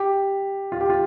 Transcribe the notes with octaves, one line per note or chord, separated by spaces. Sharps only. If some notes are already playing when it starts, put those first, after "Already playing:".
Already playing: G4
F4
G4
F4